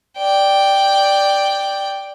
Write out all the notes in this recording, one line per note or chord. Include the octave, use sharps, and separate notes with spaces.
D5 G5